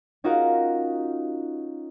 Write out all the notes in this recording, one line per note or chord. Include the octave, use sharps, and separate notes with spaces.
C#4 D#4 F4 F#4 A#4